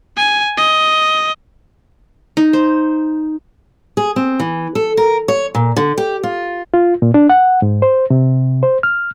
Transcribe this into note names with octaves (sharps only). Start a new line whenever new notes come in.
G#5
D#5
D#4
C5
G#4
C4
E3
A4
A#4
C#5
A#2
D3
G4
F4
F4
A#2
D4
F#5
G#2
C5
C3
C5
F6